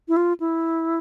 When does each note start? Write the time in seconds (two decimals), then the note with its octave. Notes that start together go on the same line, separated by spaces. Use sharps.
0.08 E4
0.17 F4
0.40 E4